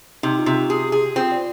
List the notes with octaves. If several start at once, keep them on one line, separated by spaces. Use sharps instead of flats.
C3 D#4
F4
C3
G4
G4 G#4
G#4
C4 F4
D5